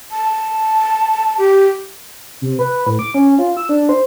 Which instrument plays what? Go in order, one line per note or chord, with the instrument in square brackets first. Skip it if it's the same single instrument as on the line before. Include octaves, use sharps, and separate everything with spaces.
[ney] A5
G4
[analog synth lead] C3
B4
A2
D6
C#4
F4
E6
D4
C5